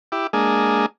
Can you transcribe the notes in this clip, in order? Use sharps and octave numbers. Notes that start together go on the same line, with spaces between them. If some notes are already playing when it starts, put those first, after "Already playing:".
E4 G4 D6
G#3 A#3 D4 G#4